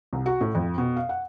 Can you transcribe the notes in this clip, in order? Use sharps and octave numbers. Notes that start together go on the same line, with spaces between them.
C2
F#4
A2
F2
B2
F5
F#5